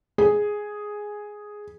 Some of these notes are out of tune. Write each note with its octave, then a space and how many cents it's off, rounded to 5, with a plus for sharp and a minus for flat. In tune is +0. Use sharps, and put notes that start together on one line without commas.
G#4 +0